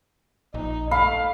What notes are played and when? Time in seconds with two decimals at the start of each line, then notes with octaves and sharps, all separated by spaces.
0.54 A#1 D#4
0.91 A3 F5 B5